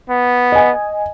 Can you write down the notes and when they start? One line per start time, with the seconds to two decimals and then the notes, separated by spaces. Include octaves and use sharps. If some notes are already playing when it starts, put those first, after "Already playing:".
0.10 B3
0.52 D#5 G#5